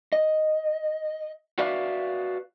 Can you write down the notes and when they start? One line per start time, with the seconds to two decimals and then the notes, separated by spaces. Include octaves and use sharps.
0.13 D#5
1.58 F#4 B4 D5 E5 F5